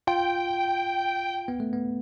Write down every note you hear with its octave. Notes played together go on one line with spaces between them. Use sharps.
F4 G5
B3
A3
B3